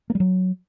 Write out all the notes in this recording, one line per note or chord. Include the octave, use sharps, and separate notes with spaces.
A#3
G3
F#3